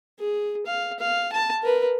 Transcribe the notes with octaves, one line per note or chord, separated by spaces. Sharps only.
G#4
F5
F5
A5
A#4 B4